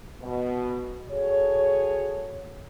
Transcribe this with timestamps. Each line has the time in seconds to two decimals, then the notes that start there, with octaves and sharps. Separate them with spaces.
0.22 B2
1.09 F#4 G#4 A4 C#5